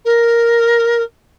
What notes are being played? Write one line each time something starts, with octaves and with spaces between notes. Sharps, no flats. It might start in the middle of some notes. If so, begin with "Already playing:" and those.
A#4